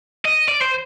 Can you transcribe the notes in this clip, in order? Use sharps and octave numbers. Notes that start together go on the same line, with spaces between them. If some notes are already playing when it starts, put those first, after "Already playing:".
D#5
D5
C5